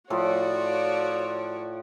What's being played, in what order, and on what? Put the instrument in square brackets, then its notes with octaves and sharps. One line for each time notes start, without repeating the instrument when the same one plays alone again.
[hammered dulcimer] A2 F3 [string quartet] F#4 C#5 D5